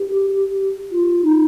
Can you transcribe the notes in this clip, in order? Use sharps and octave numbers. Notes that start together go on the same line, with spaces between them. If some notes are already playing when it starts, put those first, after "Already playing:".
Already playing: G4
F4
D#4